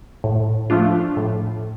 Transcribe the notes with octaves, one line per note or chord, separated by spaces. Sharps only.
A2
F3 A3 D4 F4
A2